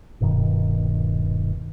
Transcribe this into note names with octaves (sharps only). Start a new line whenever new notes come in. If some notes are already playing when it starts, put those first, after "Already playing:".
D#1 G2 B2 D#3